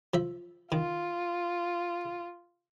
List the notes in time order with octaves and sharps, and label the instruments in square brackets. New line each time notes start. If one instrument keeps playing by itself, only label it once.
[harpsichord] F3 E5
[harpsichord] D#3 [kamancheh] F4